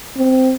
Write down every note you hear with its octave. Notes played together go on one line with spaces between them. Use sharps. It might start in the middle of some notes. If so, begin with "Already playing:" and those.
C4